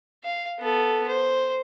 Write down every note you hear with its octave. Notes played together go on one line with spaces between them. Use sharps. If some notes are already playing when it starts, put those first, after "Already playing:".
F5
B3 A4
C5